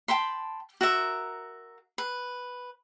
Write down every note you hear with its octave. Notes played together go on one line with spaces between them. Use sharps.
G5 A5 B5 C6
F#4 A#4 E5
B4